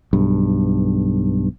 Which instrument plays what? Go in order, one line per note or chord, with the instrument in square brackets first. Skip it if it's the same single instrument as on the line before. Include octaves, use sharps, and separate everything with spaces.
[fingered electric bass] B1 G2